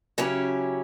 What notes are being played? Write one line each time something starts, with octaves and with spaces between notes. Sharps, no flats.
C#3 F#3 C#4 E4 G4